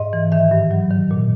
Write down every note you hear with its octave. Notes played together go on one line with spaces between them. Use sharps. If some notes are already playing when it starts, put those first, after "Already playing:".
Already playing: G#2 D#5
E3
D#3 E5
G2
F#3
D#3
A#2